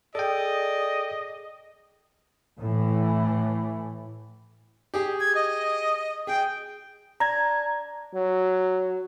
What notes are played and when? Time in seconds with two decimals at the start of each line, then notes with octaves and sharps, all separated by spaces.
0.15 G#4 A4 D5 D#5 G5
2.60 A2 E3
4.94 G4 G#4 G5
5.20 G#6
5.35 D#5
6.27 G#4 G5
7.20 D4 A#5 G#6
8.14 F#3